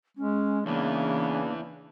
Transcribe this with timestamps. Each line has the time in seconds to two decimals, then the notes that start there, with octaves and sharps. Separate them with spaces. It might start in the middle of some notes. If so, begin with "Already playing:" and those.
0.17 G#3 C#4
0.66 E2 C#3 E3 A#3 D4